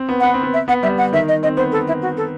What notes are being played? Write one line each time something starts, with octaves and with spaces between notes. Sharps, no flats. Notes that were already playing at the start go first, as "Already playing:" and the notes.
Already playing: C4
B3
B3 F#5
C4
B3
E5
B3 F#5
G3 E5
F#5
D#3 E5
D#5
C4 D#5
B3 C5
A4
E4
F#4
A4